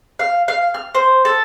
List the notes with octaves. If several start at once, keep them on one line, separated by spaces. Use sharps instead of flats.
F5
F5
F6
C5
A4